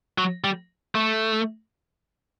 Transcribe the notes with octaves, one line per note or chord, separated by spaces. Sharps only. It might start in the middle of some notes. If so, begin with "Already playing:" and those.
F#3
G3
A3